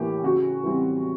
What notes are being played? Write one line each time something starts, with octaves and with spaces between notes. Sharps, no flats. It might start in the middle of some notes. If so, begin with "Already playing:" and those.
Already playing: A2 E3 A#3 G4
C#3 F#4
E3 G3 C4